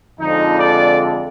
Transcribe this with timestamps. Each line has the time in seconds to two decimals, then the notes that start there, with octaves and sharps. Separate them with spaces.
0.19 F2 D3 G#3 D#4
0.58 D5